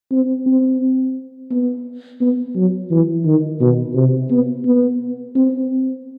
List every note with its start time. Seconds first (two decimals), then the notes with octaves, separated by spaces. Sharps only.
0.12 C4
0.46 C4
1.51 B3
2.21 B3
2.56 F#3
2.91 E3
3.26 D#3
3.61 B2
3.95 C3
4.30 B3
4.65 B3
5.35 C4